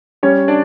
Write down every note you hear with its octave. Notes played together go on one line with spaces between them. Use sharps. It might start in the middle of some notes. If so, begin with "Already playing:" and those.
G3 C#4 C#5
D4 D5